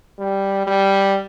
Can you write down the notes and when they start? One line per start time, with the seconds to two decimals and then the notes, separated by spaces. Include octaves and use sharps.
0.19 G3
0.67 G3